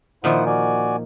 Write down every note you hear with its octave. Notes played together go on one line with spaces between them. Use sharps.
A#2 D#3 F3 E4 C5 F#5
F#4 D5 G#5